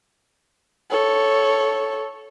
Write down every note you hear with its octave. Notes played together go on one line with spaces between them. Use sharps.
A4 C#5